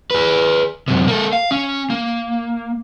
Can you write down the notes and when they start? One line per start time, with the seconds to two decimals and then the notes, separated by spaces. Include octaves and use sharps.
0.11 G#4 B4
0.88 F#2 C3
1.08 A#3 A4
1.33 F5
1.51 C#4
1.90 A#3